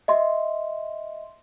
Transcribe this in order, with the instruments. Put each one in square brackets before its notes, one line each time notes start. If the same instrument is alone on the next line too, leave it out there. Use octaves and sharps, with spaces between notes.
[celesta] D#5 E5 C6